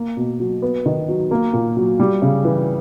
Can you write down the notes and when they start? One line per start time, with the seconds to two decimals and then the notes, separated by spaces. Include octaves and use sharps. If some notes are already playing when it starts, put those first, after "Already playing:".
Already playing: A#3
0.17 B2
0.40 F#3
0.62 B3
0.86 D#3
1.08 F#3
1.31 A#3
1.53 A#2
1.77 F#3
1.99 G3
2.22 C#3
2.45 E3